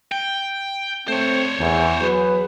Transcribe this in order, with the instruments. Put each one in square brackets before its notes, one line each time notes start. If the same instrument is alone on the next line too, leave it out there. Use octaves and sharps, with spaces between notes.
[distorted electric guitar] G5
[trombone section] A3 C4 [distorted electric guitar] C5 C#5
[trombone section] E2
F#3 G#4 B4